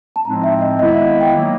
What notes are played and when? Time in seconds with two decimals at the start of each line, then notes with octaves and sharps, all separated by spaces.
0.16 A5
0.25 A2 F3 G#3 C4 D#4 A#5
0.44 E5
0.61 D#5
0.79 D#3 G#3 B3 E4 D#5
0.93 E5
1.06 F5
1.21 G5
1.35 D#3 F#3 A#3 D#4